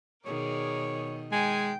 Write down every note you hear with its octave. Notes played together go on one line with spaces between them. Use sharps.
B2 D#3 G#4 A#4 C#5 D5
G#3 G5 G#5